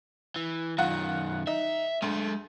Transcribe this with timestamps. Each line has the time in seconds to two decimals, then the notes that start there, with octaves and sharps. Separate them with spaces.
0.36 E3
0.78 F#2 D#3 F4 F#5
1.47 D#4 E5
2.02 D2 G#3 A4